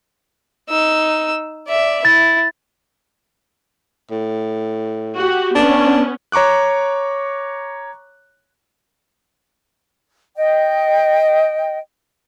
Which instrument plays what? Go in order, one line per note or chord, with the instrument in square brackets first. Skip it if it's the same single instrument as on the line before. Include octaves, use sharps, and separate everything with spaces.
[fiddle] D#4 E6
D5 E5
[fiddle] E4 [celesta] A6
[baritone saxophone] A2
[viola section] F#4 G4
[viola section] B3 C#4 [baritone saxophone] D4
[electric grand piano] C#5 A#5 C#6 D6 F#6
[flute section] D#5 G5